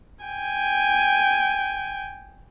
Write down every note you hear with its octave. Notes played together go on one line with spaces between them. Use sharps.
G5 G#5